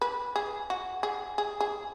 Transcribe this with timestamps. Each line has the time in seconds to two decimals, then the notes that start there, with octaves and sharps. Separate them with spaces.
0.02 B4
0.36 G#4
0.70 F#4
1.03 G#4
1.38 G#4
1.60 G#4